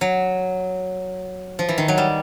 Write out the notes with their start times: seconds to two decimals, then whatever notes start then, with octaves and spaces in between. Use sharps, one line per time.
0.01 F#3
1.59 F3
1.69 E3
1.78 D#3
1.88 F#3
1.98 G3